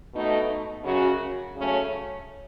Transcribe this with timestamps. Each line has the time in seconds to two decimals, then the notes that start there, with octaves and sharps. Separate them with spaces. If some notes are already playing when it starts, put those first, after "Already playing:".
0.15 B2 A3 D#4
0.84 F#2 C#3 F#3 C#4 F#4
1.55 C#3 F#3 A3 C#4